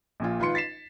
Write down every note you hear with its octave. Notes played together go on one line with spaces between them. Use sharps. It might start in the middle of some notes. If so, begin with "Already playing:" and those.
A#1 A#2 F4
G#1 F4 B4 C6 C#7
A6 B6 C7 E7